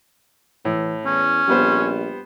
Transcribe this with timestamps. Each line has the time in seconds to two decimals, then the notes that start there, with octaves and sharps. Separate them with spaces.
0.65 A2 E3
1.05 E2 C#4
1.48 A#1 G3 B3 C5